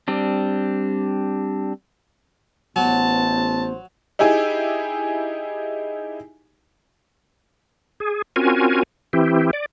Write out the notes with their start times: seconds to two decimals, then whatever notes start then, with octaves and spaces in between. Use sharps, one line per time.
0.08 G3 C4 D4
2.76 A1 F#3 B3 C5 A5
4.19 D#4 E4 G4 G#4 G#5
8.00 G#4
8.36 C4 C#4 F4 F#4 A#4 G#5
9.13 E3 C4 E4 G4
9.53 D5